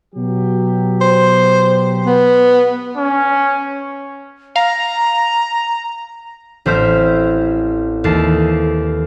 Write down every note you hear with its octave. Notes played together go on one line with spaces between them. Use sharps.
B2 F#3 G4
C5
B3
C#4
F5 A#5
A1 C4 C5 E5 F6 G6
D#2 E3 A4 C7